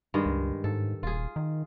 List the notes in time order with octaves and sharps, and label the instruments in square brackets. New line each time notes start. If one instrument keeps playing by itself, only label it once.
[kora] G2 D#3 G#3
[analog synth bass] C#2
[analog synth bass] G#2 [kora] A4
[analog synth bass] D#1 [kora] F4 G#4
[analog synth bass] D#3